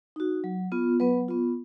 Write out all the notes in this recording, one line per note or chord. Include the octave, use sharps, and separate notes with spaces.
D#4 F#4
F#3
B3 F4
F#3 B3 B4
B3 F4